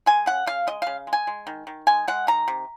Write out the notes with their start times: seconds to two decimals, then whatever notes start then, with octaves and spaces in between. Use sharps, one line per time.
0.06 G#3 G#5
0.26 C#3 F#5
0.46 C#3 F5
0.67 G#3 D#5
0.82 C#3 F5
1.07 G#3
1.13 G#5
1.27 G#3
1.47 D#3
1.67 D#3
1.87 G#3 G#5
2.08 G#3 F#5
2.27 D#3 A#5
2.48 C3